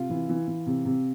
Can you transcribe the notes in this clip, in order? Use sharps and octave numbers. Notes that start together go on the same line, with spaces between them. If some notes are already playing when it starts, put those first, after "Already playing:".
Already playing: C3 F4
E3
E3
E3
C3
C3